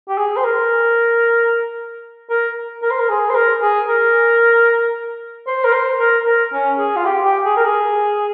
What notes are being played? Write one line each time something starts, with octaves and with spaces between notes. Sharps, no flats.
G4
G#4
C5
A#4
A#4
A#4
C5
A#4
G#4
C5
A#4
G#4
A#4
C5
A#4
C5
A#4
A#4
C#4
G#4
F4
G4
G4
G#4
A#4
G#4